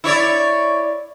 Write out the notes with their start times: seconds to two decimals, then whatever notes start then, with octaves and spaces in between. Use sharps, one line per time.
0.04 E4 C#5 D5